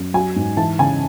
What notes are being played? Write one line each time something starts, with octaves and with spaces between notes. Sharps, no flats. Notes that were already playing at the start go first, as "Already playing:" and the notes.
Already playing: F#2
F#3 G#5
G#2
E3 A5
C#3 G#5